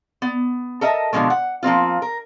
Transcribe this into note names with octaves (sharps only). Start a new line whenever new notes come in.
B3
A4 A#4 D#5 E5 A5
B2 D3 F3 G#3 A3
F#5
F3 A#3 C4 F4
A#4